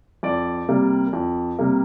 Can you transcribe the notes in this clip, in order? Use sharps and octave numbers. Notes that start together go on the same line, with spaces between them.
F2 D5
C3 G3 A#3
F2
C3 G3 A#3